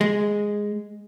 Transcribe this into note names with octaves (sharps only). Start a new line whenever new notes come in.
G#3